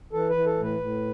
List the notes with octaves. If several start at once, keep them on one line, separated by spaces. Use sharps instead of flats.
E3 A4
E3 B4
A4
A2
B4
A2